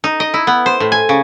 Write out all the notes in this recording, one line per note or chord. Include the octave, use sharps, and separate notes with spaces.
D#4
D#5
E4
B3
C5
A2
G#5
C#3